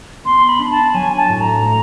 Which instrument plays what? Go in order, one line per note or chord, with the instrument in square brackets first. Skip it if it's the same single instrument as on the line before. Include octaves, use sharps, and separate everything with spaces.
[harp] B3 [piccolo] C6
[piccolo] B5
[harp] D4
[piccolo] A5
[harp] F#3 [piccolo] G#5
[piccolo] G#5
A5
[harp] A2
[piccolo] A#5
[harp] A3